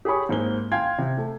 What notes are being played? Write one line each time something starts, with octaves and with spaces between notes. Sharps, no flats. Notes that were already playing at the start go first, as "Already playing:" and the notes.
G4 G#4 C#5 B5 C#6
G#2 A#3 C4 G7
F5 G5 C6 G#6
C3
A3